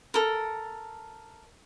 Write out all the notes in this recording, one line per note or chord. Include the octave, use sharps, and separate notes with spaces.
A4 A#4